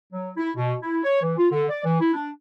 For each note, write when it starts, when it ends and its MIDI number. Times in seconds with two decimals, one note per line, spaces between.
0.13 0.31 54
0.37 0.50 64
0.57 0.75 47
0.82 0.99 64
1.04 1.22 73
1.23 1.34 52
1.38 1.47 65
1.52 1.64 50
1.69 1.81 74
1.85 1.96 52
2.01 2.12 64
2.14 2.29 62